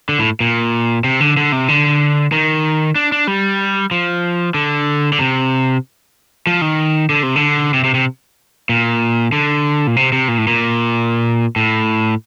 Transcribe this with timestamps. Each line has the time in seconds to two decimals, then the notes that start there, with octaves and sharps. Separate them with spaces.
0.09 D3
0.19 A2
0.40 A#2
1.04 C3
1.20 D3
1.37 D3
1.52 C3
1.68 D3
2.32 D#3
2.95 D4
3.12 D4
3.27 G3
3.91 F3
4.54 D3
5.12 D3
5.19 C3
6.47 F3
6.62 D#3
7.09 D3
7.23 C3
7.36 D3
7.74 C3
7.84 C3
7.94 C3
8.69 A#2
9.32 D3
9.87 A#2
9.96 C3
10.13 C3
10.28 A#2
10.38 A2
10.47 A#2
11.56 A2